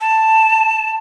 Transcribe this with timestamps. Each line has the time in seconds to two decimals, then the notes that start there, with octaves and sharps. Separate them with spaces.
0.01 A5